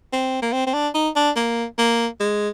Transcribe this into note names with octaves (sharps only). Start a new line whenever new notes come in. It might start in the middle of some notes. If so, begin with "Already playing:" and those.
C4
A#3
C4
C4
D4
D#4
D4
A#3
A#3
G#3